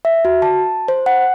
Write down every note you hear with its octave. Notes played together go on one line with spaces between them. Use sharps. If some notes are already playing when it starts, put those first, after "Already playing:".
E5
F#4
A5
C5
F#5